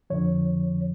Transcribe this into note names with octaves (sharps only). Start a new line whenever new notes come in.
F2 D3 F3 C#5